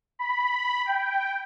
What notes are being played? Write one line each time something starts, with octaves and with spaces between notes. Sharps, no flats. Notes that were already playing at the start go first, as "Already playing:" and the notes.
B5
G5